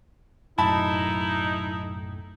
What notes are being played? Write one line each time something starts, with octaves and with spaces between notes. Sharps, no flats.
B1 F#2 A2 D#4 E4 A5 B5